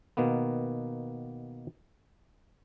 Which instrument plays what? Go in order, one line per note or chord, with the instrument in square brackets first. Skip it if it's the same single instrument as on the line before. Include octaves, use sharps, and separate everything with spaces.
[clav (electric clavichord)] B2 D#3 A#3 B3